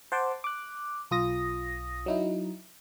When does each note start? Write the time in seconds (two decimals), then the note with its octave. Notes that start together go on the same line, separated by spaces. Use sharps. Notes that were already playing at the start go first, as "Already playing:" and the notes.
0.12 C5 F#5 A5 C6 D6
0.44 D6 F#6
1.11 B1 F4 D#6 A#6
2.06 F#3 D#4 E4